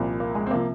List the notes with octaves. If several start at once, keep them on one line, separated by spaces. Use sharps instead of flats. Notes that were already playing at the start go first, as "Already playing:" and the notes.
Already playing: C2 A#2 F3
A#3
G#3
C4
C3 F3 A#3